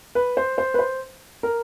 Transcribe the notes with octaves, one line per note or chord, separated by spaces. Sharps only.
B4
C5
C5
B4
C5
A#4